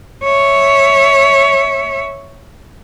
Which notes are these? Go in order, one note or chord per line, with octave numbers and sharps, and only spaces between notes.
C#5 E5